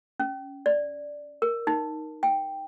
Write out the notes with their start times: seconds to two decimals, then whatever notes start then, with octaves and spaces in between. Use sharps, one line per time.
0.20 C#4
0.66 D5
1.42 A#4
1.67 D#4
2.23 G5